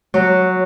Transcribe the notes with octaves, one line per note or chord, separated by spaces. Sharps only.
F#3